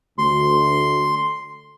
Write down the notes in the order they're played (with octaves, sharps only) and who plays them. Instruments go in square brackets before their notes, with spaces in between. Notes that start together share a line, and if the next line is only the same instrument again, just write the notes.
[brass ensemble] D2 [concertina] C6